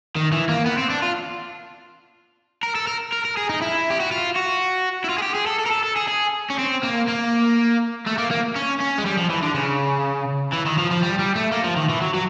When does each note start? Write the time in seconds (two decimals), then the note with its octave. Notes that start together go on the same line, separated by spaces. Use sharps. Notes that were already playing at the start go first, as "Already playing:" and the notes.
0.16 D#3
0.32 E3
0.49 A#3
0.66 B3
0.78 C4
0.90 D4
1.02 F4
2.63 A#4
2.75 A4
2.87 A#4
3.12 A#4
3.25 A#4
3.37 G#4
3.49 D#4
3.62 E4
3.90 G4
4.00 F#4
4.11 F4
4.36 F#4
5.04 E4
5.10 F4
5.18 G#4
5.22 G4
5.35 G#4
5.47 A4
5.59 A4
5.66 A#4
5.71 A4
5.84 A4
5.96 G#4
6.08 G#4
6.50 C#4
6.59 C4
6.83 A#3
7.08 A#3
8.07 A3
8.18 A#3
8.31 A#3
8.55 C#4
8.80 C#4
8.98 G#3
9.06 G3
9.17 F3
9.30 E3
9.42 D3
9.54 C#3
10.53 E3
10.66 D#3
10.78 F3
10.91 F3
11.02 G3
11.19 G3
11.36 A3
11.52 A#3
11.64 F3
11.76 D#3
11.89 E3
12.01 F#3
12.14 F#3